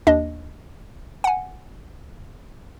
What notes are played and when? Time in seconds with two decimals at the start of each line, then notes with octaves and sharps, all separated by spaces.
0.07 D#2 D4 D#5
1.24 F#5 G#5